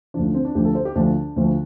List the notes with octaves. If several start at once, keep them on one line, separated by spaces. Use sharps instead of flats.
D2 D3 F3 D4
D4
C4
D4
D2 D3 F3 G4
A4
C5
G4
D2 D3 F3 D4
D2 D3 F3